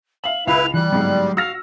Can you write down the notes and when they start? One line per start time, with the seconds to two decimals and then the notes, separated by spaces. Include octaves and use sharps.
0.24 E5 F5 F#7
0.47 C#2 E4 B4 F5 B5 F7
0.74 E3 G3 F#6
0.92 G1 G#2 F#3 G#3
1.37 F#4 F5 E6 F6 A#6